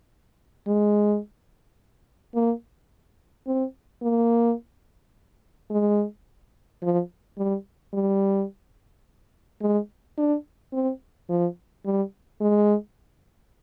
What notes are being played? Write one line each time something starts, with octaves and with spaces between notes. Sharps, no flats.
G#3
A#3
C4
A#3
G#3
F3
G3
G3
G#3
D4
C4
F3
G3
G#3